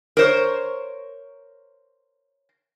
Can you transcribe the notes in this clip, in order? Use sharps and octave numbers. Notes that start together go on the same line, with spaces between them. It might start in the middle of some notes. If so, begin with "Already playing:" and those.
A#4 C5 C#5